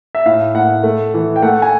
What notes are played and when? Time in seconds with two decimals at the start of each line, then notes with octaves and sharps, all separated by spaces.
0.15 E5
0.26 A2 F5
0.54 A2 F#5
0.83 A3
1.14 E3
1.36 G5
1.42 A3 F#5
1.62 G#5